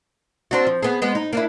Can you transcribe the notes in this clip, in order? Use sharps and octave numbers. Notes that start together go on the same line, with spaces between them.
C4 D4 F#4
F3
B3 G#4
G#3 B3
D#4
A#3 D4 E4